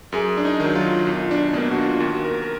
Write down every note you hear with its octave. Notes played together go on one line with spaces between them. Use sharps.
F#2 G#4
D4
D#4
D#3 F#3
F4
B1 F4
D4
B2 A#3 D4
F#4
F4
D#2 F#4
A#4
A#4